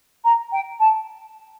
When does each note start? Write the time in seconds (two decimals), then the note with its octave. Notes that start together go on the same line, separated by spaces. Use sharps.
0.24 A#5
0.52 G5
0.80 A5